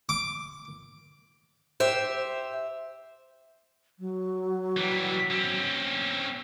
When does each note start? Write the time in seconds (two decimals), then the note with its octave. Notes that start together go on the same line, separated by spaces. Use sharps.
0.09 D6
1.80 G4 C5 E5
3.99 F#3
4.77 E3 G3
5.31 C4 C#4